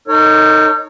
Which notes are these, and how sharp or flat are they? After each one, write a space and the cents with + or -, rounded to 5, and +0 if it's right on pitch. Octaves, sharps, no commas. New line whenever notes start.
D#4 +0 A#4 -45 C#5 +0